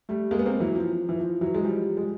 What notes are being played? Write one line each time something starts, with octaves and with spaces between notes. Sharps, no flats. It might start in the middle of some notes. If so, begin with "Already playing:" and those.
G3 A3
G#3 A#3
B3
A#3 C4
E3 F#3
F3
E3
F3
E3 F#3
G#3
F3 G3
G#3